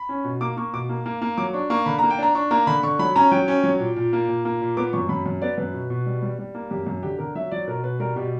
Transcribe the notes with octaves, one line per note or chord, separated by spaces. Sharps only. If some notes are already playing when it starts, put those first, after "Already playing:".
Already playing: B5
C#4
B2
A#3 D6
A#3 C#6
B2 D6
A#3
A#3
A#3
F#3 D6
D4 C#6
A#3 C#6
D3 B5
A#5
A#3
G5
D4 A#5
D4 C#6
A#3 A#5
D3 B5
D3 C#6
F#3 B5
C#4 A#5
F#3 G5
C#4
F#3
A#2
A#2
A#3
A#2
A#3
A#2
B3 D6
F#2 C#6
F#2 B5
F#2
B3 D5
F#2 B4
B2
B2
G3
G3
G3
A#3
F#2 G4
F#2
D3 G4
D3 A#4
F#3 E5
F#3 D5
B2 A#4
B2 B4
G3 A#4
B2 G4